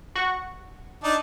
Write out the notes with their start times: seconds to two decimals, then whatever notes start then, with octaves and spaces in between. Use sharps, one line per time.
0.15 F#4 F#5 C#6
1.04 D4 D#4 D5